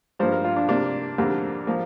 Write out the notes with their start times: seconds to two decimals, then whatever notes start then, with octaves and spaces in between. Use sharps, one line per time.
0.19 G2 F3 A#3 C5
0.32 A#4
0.45 F4
0.56 D4
0.68 C3 A#3 D4
1.18 F2 D3 G3 A#3
1.67 F3 A#3